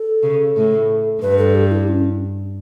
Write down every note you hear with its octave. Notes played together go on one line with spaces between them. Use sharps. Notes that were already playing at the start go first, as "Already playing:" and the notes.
Already playing: A4
C#3
A2
G2 B4
A4
G4
E4
C#4